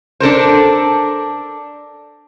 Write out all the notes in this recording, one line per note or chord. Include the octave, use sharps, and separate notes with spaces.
D4 A4 A#4 C5